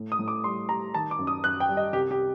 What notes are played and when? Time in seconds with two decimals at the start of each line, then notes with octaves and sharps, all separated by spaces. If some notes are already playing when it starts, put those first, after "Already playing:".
Already playing: A2
0.12 D#6
0.19 A2
0.28 D6
0.44 G3 C6
0.69 G3 A#5
0.94 D#3 A5
1.11 D6
1.18 F#2
1.27 D#6
1.43 F#2 F#6
1.60 G5
1.69 G3
1.77 D#5
1.93 C2 G4
2.11 G4